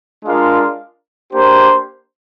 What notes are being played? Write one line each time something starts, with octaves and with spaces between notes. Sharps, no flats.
G#3 D4 F4 A#4 F5
A#3 D4 G4 C5